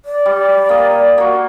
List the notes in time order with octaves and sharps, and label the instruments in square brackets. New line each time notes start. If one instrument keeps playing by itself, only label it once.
[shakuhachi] D5
[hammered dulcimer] G3
A#3 D#5
A#3 F#4